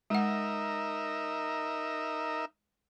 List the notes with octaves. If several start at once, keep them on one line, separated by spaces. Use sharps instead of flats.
G#3 D#4 A#4 E5 F#5